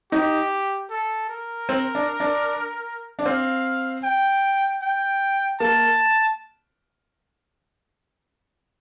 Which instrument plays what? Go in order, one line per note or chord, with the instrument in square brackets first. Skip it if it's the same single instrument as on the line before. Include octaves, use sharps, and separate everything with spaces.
[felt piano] D#4 [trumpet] G4
[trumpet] A4
A#4
[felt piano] C4
D4
D4
D4
[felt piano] C4 [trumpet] F5
[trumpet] G5
G5
[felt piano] A#3 [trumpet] A5